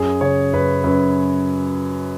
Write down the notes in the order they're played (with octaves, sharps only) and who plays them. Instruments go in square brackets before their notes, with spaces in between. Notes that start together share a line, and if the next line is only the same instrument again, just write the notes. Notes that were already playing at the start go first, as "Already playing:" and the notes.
Already playing: [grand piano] F#2 G#4
C#3 C#5
F#2 B4
F#2 B4